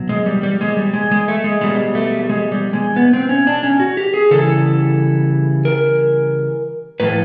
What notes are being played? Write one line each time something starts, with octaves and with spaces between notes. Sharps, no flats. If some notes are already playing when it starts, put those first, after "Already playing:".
Already playing: B2 F#3
G#3
G3
G3
G#3
G3
G#3
G#3
A3
G#3
B2 G3 G#3
A3
G#3
G3
G#3
B3
C4
C#4
D4
C#4
F#4
G4
G#4
C#3 E3 G3 A4
A#4
A2 F3 B4